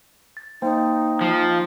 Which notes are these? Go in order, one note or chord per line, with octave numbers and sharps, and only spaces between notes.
A6
A#3 D#4 C5 G5
F3